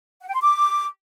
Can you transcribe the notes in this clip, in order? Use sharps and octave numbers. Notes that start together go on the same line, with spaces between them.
F#5
G5
C6
D6